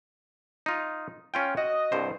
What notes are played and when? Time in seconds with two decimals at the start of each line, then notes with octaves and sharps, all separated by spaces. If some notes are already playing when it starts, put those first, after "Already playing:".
0.66 D#4 F4
1.34 C#4 F4 G5
1.57 F#4 D#5
1.92 C2 G2 C5